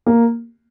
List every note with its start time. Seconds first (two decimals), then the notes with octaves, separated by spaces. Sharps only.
0.06 A#3